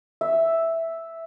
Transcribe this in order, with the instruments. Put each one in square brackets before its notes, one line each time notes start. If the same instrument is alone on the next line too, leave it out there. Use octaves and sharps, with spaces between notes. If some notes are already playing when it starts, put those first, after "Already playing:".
[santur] E5